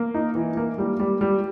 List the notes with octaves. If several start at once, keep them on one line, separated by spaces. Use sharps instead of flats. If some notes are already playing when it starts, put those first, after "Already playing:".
Already playing: A#3
D#4
E3
A#3
G3
G3
G3